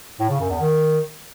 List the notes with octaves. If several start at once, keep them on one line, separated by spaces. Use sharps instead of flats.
A2
C#3
F#2
E2
D#3